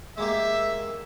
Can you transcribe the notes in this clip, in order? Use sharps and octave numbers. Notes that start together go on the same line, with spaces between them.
G#3 A#3 G4 E5